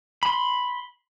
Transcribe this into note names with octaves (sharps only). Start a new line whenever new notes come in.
B5 C6